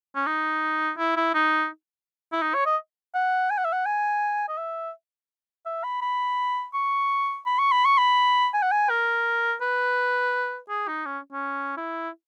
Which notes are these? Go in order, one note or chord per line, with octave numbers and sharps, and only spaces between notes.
C#4
D#4
E4
E4
D#4
E4
D#4
C#5
D#5
F#5
G#5
F#5
E5
F#5
G#5
D#5
E5
E5
B5
B5
C#6
B5
C#6
B5
C#6
B5
G#5
F#5
G#5
A#4
B4
G#4
D#4
C#4
C#4
E4